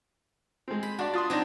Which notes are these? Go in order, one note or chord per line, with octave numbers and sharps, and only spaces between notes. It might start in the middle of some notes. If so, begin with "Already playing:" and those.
G#3 C4
B5
D4 F#4 D5
F4 C6 D#6 A6
F#3 C4 D4 D#4 C5 A#6